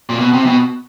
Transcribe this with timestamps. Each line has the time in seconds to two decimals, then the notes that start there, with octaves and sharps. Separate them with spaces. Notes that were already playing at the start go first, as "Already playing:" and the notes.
0.09 A#2
0.19 B2
0.33 C3
0.46 B2